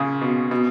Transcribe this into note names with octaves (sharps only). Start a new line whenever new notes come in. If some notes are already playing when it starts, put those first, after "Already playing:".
Already playing: A#2 C#3
B2
B2